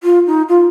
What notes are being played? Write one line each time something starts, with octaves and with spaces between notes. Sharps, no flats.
F4
D#4
F4